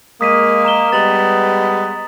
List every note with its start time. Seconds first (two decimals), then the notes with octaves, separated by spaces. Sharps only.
0.21 G#3 A#3 D#6 B6 D#7
0.65 A#5 E7 G7
0.92 G3 G#3 B3 A6 F7 F#7